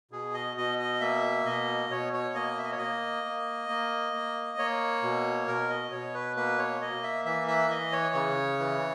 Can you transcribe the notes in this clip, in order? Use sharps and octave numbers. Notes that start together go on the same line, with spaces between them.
B2 G#4
D#5
B2 D#5
D#5
A#3 E5
B2 D#5
B2 C#5
C#5
A#3 D#5
E5
D#5
C#5
A#3 D#5
A#3
A#3
A#3
A#3 C#5
B2
B2 A#4
D#5
B2 C#5
B4
A#3 B4
C#5
A#3 D#5
E5
E3 E5
E5
E3 D#5
C#5
C#3
E3